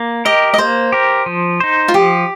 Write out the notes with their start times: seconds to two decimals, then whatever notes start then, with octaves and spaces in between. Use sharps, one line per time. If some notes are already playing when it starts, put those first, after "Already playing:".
Already playing: A#3
0.25 G4 A#4 D#5
0.54 D#5
0.58 A#3 C5
0.92 G4 A#4
1.26 F3
1.60 D#4 C5
1.88 F4
1.94 F3 G4